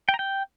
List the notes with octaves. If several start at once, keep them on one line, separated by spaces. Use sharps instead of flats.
G5
A#5
G5